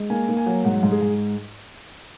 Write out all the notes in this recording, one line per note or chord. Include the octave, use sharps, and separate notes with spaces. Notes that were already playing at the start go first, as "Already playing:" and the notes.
Already playing: G#3
A#3 G#5
A#3
G#5
F#3
G#2 F#5
G#2
G#4
G#2